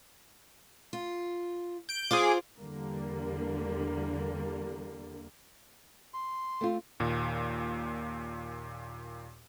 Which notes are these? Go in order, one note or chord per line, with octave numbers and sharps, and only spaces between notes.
F4
G6 D7
F4 G#4 C5 D6
E2 D3 G3 A#3
C6
A3 C4 F4
D#2 A#2